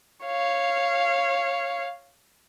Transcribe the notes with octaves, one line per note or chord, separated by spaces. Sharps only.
C#5 F5